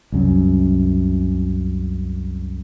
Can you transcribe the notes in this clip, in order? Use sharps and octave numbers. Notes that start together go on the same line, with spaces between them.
C2 F#2